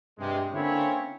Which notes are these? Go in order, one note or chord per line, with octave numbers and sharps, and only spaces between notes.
G2 C3 G#3
D3 A#3 C4 C#4 E4 C#5